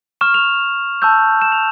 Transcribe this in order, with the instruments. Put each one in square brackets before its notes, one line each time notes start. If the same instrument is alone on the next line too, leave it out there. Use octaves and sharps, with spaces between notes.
[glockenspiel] C#6 F6 E7
F7
A5 C#6 E6 G6
E7
F7